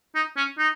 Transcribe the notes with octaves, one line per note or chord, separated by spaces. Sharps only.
D#4
C#4
D#4